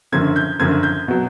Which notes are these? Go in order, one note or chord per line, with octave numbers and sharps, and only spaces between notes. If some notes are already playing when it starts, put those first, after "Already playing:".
F#1 F#2 D3 F3 G#6
G6
F#1 F#2 D3 F3 G#6
G6
B2 F#3